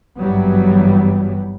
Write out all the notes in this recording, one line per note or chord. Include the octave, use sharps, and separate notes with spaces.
G#1 G2 E3 F#3 G3 B3